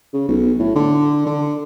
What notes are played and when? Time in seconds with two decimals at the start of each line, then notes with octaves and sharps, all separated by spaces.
0.14 C#3
0.28 B1
0.59 A2
0.76 D3
1.26 D3